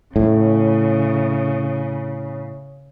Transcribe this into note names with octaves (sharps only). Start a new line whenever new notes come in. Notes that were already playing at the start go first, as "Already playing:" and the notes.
A2 C#3